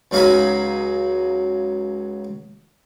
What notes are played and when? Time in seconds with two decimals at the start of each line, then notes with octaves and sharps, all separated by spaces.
0.11 C#2 F#3 D#4 F5 G#5 B5